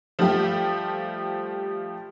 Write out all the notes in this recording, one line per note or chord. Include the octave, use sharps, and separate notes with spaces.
F3 G3 A3 G4